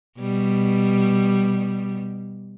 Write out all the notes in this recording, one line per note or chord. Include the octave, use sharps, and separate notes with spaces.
B2 G3